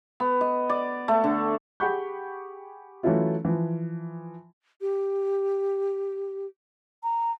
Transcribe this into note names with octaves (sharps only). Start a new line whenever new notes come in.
B3
D#5
D5
A3
D3
G4 G#4 F#5 B5 C#6 G6
E3 F#3 A3 C#4 E4 F4
E3 F3
G4
A#5